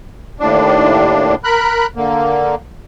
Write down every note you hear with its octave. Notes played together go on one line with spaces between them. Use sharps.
D#2 A2 D4
A#4 B5 F#6
D3 A#3